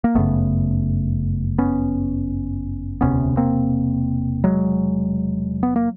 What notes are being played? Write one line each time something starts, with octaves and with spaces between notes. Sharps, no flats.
A#3
G1 F#2 C#3 A3 B3
B3 C#4
E1 D2 C3 B3 C#4
A#3 C4
F#3 G#3
B3
A#3